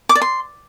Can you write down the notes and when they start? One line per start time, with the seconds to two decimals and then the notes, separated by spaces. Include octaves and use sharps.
0.09 D6
0.15 D5
0.21 C6